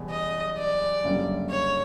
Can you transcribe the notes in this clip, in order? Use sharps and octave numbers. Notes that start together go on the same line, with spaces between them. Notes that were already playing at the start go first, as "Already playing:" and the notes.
Already playing: F#1 E2 B2 G3
D#5
D5
F#1 F#2 D3 G3 A#3
C#5